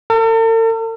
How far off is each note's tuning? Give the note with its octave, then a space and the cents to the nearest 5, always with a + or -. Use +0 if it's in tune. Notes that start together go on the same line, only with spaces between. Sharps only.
A4 +45